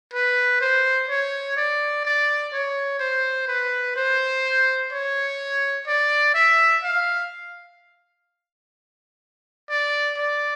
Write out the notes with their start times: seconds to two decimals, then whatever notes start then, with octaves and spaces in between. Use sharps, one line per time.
0.13 B4
0.61 C5
1.09 C#5
1.57 D5
2.05 D5
2.53 C#5
2.99 C5
3.48 B4
3.96 C5
4.92 C#5
5.87 D5
6.34 E5
6.83 F5
9.70 D5
10.18 D5